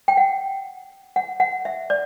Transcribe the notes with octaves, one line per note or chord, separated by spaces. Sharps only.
G5
F#5
F#5
F#5
E5
D5